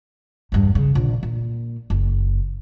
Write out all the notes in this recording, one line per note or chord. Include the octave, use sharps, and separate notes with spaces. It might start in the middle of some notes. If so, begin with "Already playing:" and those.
E2 G2
C#3
A#1 D3
A#2
F#1